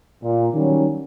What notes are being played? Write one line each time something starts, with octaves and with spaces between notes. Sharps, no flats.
A#2
D#3 F#3 G3 C#4